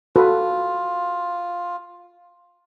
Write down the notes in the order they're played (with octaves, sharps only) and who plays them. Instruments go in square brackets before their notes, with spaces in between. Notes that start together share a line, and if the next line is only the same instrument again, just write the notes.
[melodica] F4 [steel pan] F#4 A4 B4